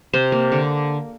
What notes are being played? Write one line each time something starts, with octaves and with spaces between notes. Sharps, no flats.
C3 C5
A#3
D3